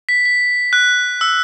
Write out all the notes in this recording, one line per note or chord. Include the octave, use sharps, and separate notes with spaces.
B6
B6
F#6
E6